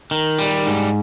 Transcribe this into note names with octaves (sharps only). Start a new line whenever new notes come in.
D#3
G3
G#2